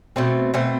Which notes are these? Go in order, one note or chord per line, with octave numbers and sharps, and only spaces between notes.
B2 A3 C4
B2 A3 C4